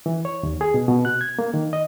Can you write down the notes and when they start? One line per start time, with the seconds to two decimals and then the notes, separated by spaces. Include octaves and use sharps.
0.06 E3
0.25 C#5
0.43 D#2
0.61 G#4
0.74 B2
0.88 B2
1.05 F#6
1.21 G#6
1.39 A#3
1.54 D#3
1.73 D#5